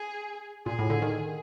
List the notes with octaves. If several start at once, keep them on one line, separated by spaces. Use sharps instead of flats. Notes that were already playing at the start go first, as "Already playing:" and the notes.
Already playing: G#4
A#2 G#4
A2
D3
D#3